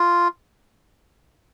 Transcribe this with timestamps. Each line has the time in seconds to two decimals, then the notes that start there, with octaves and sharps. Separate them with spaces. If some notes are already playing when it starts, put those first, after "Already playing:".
Already playing: F4